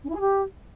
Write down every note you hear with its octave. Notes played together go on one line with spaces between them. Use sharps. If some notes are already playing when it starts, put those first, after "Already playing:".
C#4
E4
G#4
G4